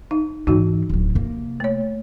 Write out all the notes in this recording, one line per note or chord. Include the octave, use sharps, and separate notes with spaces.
D#4
G#2 E3 D#4 F#4
D1 F#3
C3 A#3
A3 C#5